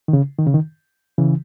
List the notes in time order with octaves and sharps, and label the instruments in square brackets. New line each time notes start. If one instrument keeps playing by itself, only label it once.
[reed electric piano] D#3
C#3
D#3
C#3
D#3
C#3 E3